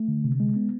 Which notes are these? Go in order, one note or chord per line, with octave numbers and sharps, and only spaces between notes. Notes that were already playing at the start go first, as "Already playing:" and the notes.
Already playing: A3
D3
C3
G#3
B3